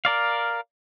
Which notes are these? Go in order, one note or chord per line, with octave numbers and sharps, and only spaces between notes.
A#4 D5 F5